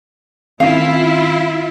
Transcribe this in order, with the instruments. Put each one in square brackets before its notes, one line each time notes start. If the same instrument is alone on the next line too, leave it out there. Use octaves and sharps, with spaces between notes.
[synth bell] D#3 C4 C#4 [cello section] E4 F4 [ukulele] F5